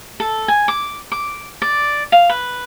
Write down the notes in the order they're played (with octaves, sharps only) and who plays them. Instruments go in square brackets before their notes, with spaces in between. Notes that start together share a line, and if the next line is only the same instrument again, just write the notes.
[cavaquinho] A4
G#5
D6
D6
D5
F5
B4